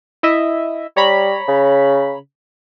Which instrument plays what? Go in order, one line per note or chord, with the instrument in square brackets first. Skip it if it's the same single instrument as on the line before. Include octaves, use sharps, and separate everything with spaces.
[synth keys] E4 D#5 E5
[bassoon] G3 [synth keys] C#5 A#5 B5
[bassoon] C#3